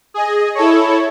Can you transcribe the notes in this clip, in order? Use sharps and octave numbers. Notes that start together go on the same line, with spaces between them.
G#4 D#5
E4 A4 C#5